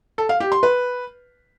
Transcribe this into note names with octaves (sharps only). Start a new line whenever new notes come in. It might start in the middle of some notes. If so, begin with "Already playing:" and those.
A4
F5
G4
C6
B4